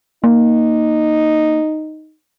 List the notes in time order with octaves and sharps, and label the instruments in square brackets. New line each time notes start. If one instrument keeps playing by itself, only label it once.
[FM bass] A#3 [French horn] D#4